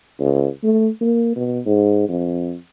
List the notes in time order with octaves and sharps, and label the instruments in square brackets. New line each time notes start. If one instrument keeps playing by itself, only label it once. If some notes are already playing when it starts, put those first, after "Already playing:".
[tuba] C#2
A3
A#3
B2
G#2
F2